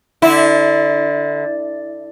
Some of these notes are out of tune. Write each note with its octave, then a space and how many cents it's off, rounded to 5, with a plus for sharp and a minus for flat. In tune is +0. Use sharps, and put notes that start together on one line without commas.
D3 +0 E4 -20